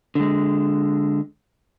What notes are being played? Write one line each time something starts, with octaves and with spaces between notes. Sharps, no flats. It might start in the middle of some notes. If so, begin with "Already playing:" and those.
D3 G#3